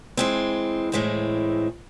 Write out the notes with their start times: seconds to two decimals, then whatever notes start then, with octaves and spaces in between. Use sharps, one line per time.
0.17 E3 G#3 C4
0.92 A2 E3 G#3 C4